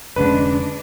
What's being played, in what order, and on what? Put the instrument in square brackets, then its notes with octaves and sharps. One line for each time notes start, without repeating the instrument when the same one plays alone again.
[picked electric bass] F1 G#2 D3 [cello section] G#3 D4 [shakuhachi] C#4 [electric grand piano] B4